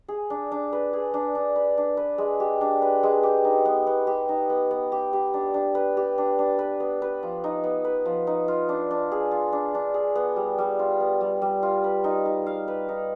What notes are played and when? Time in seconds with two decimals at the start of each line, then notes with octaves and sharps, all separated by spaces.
0.08 G#4
0.30 D4
0.52 D4
0.73 B4
0.93 G#4
1.14 D4
1.35 D4
1.56 B4
1.77 D4
1.97 B4
2.18 G#3
2.40 G4
2.61 D4
2.82 B4
3.03 G#3
3.23 G4
3.45 D#4
3.65 B3
3.87 B3
4.07 G4
4.29 D#4
4.50 B3
4.71 B3
4.92 G4
5.13 G4
5.34 D4
5.54 D4
5.75 B4
5.97 G4
6.18 D4
6.39 D4
6.59 B4
6.80 B3
7.02 B4
7.23 F3
7.44 D#4
7.64 B3
7.85 B4
8.06 F3
8.27 D#4
8.48 F4
8.69 D4
8.91 D4
9.12 G#4
9.31 F4
9.53 D4
9.75 D4
9.94 G#4
10.16 B3
10.36 G3
10.58 G3
10.79 F4
11.00 B3
11.21 G3
11.42 G3
11.63 F4
11.84 B4
12.04 D#4
12.25 D#4
12.46 F5
12.68 B4
12.89 D#4